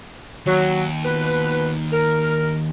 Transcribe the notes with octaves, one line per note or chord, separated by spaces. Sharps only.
D#2 F#3
B2 F3 B4
A#4